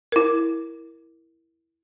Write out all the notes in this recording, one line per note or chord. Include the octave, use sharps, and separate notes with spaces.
E4 A#4